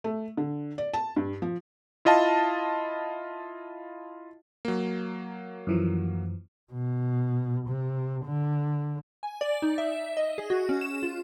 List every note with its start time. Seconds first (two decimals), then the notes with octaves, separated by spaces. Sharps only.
0.04 A3
0.37 D3
0.78 D5
0.94 A5
1.16 G2
1.42 F3
2.05 E4 F4 D#5 F5 A5
4.65 F#3 A#3
5.67 F#2 E3 F3
6.73 B2
7.68 C3
8.25 D3
9.23 G#5
9.41 D5
9.62 D#4
9.78 E5
10.17 D#5
10.38 G#4
10.50 F#4
10.69 C#4
10.81 E7
11.03 F4